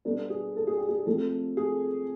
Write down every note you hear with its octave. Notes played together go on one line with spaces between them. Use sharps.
B2 G3 B3 D4 A4
G#4
A4
G#4
G4
G#4
F3 A3 C4 A4
G#4